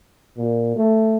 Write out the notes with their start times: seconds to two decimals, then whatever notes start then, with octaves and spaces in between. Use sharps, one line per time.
0.37 A#2
0.77 A3